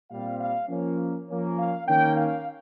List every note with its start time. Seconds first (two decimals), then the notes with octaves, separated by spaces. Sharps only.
0.10 A#2 G3 C4 F5
0.40 F5
0.69 F3 A#3 C#4
1.28 F3 A#3 C#4
1.58 F5
1.87 D#3 A#3 C#4 G5
2.16 F5